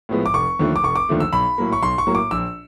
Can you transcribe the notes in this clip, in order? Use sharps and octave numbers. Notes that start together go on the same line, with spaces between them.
A2 F3 G#3 B3
D6
F1 C#6
D#2 D3 F3 A3
D6
F1 C#6
D6
D#2 D3 F3 A3
E6
B1 B5
A2 F#3 A#3
C#6
B1 C6
C#6
A2 F#3 A#3
D6
A#1 E6